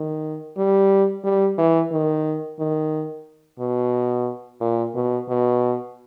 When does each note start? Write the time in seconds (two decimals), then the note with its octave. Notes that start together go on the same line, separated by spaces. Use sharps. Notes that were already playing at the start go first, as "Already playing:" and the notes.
Already playing: D#3
0.57 G3
1.24 G3
1.58 E3
1.92 D#3
2.59 D#3
3.60 B2
4.61 A#2
4.95 B2
5.29 B2